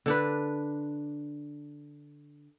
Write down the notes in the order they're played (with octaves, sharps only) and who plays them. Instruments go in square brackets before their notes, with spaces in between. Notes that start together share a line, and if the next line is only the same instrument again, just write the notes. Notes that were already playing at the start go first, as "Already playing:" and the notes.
[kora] D3 D4 B4